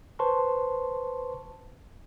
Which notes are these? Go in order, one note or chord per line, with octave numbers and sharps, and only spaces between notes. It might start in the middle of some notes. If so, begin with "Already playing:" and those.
B4 C5 A5 C6 C#6